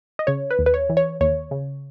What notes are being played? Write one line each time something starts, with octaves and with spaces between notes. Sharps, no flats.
D#5
C#3 C#5
B4
D#2
B4
C#5
E3
C#5
D#2 C#5
C#3